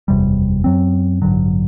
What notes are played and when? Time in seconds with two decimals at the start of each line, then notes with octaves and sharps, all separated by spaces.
0.08 F#1 E2 C3 G3
0.64 F#2 F#3 C4
1.22 A1 G2 D3 F#3